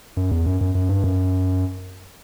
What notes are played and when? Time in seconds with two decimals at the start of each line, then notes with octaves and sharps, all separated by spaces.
0.17 F#2
0.31 E2
0.46 F#2
0.61 F#2
0.75 F#2
0.89 G2
1.04 F#2